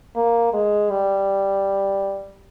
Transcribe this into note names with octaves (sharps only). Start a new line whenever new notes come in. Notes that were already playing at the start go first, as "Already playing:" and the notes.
A#3
G#3
G3